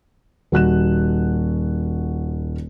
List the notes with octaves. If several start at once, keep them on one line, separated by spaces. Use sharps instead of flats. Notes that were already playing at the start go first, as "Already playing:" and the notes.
D#1 F#4 F#6 E7